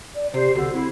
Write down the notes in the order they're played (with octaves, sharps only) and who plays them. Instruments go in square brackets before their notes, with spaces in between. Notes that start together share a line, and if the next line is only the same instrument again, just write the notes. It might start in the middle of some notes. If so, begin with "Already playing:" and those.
[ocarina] D5
[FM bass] C3 [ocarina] G4 [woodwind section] C5
[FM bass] B1 [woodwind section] D3 [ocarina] F#4
[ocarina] C4 [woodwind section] E4